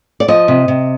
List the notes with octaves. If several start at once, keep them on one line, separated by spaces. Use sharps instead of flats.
D5
F3 D#5
C3
C3